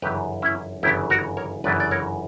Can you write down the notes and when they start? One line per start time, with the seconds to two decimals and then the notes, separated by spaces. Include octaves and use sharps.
0.02 G1 F#2 C#3 E3 G4 B4
0.42 C#4 E4
0.83 G1 F#2 C#3 E3 E4 G4
1.10 F#4 A#4
1.37 A#4 C#5
1.64 G1 F#2 C#3 E3 B4 D5
1.80 D5
1.91 A#4 C#5